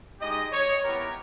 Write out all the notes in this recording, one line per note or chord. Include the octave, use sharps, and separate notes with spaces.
G#3 D#4 G4 D#5
C#5
B3 E4 G4 A#4